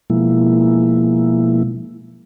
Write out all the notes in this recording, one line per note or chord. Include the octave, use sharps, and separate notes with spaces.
B2 F3 G#3 A#3 E4